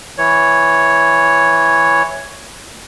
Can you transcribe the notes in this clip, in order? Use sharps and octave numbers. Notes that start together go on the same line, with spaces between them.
E3 C#5